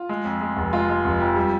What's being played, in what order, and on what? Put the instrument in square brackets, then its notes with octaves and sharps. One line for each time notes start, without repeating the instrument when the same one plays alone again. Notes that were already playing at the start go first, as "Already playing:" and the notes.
Already playing: [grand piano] F4
G#3
F2
G#3
F1
G#3 F4
G#3
F1
F2
G3